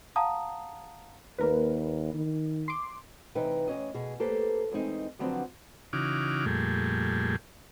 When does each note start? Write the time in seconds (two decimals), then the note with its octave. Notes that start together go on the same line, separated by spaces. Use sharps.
0.16 F5 F#5 A5 A#5 D#6
1.39 D#2 A#3 A#4 B4
2.14 D#3
2.68 C6 D6
3.35 C3 E3 D#4 B4 D#5 G5
3.68 E2 D#3 C#4 D#5
3.94 B2 G#4
4.20 A#3 G4 A4 B4 C5
4.72 E2 G#3 C4 D#4
5.19 D3 F3 F#3 B3 C4 D4
5.93 C#3 E3 D#4 F#4 D6 F6
6.46 F2 A#2 G3 A3 G#4